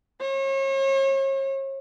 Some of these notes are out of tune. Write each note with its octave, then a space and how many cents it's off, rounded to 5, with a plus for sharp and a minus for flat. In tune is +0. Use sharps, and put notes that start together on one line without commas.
C#5 -40